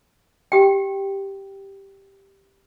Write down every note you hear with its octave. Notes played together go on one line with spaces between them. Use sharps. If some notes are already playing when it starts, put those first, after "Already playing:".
G4 G5